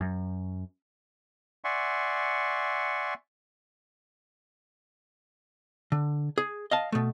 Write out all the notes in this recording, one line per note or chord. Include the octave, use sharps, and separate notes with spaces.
F#2
D5 E5 F#5 G#5 C6 C#6
D3
G#4
D#5 F5 A5
B2 A3